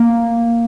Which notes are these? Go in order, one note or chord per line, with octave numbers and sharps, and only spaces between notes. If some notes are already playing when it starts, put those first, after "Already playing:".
Already playing: A#3